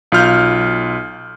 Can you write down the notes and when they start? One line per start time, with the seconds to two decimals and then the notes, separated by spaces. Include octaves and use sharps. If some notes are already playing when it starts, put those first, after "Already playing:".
0.12 B1 F4 F6 G6